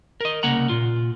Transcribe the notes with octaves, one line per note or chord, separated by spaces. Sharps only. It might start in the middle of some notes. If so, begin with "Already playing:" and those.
A#4 D#5
C2 C#3 A#3 F#5 A#5
A#2 F4